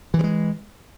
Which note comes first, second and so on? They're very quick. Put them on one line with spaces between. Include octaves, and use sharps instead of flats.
E3 F3 G#3